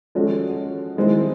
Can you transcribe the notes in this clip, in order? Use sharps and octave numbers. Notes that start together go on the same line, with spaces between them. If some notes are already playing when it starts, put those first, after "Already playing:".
F3 G#3 C#4 F#4 A4
D#3 G#3 C4 E4